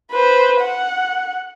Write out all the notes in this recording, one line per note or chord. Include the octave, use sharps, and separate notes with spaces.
B4 C5
F#5